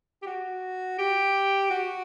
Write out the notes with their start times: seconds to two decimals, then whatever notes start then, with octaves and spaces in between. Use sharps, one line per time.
0.22 G4
0.26 F#4
0.98 G4
1.70 F#4